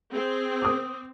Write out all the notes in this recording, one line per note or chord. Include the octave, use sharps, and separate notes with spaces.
C4 G#4
D6 D#6